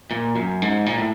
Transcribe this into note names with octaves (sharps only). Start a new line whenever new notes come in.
A#2
F#2
G#2
A#2
A2